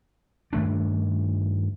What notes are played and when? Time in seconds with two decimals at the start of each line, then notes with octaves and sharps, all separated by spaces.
0.53 G2 D#3 A3 D4